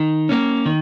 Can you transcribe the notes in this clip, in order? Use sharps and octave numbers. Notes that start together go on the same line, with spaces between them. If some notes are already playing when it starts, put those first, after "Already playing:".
Already playing: D#3
A#3 C#4
D#3